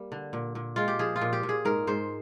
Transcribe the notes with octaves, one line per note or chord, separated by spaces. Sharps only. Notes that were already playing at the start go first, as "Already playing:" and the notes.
Already playing: G3 A#3
D3
A#2
A#2
G#3 F4
G4
F3 G#4
F4
A#2
G4
A#2
G#4
G#2 A#4
G#2 C5